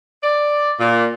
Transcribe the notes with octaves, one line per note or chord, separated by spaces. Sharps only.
D5
A#2